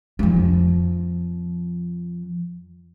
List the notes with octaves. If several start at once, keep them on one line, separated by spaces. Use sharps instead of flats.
F2 F3